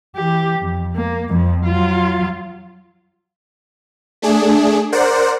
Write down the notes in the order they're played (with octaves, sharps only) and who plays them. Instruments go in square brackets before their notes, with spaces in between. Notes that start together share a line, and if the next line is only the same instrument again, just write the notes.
[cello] E3 G4
F2
A#3
F2 F3
F#3 F4
[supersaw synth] A3 D4 G#4
A#4 C5 D5 F#5